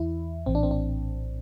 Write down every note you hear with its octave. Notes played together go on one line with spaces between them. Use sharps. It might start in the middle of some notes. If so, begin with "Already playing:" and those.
Already playing: E2 E3 E4
A#1 A2 E3 C4
D4
C4
D4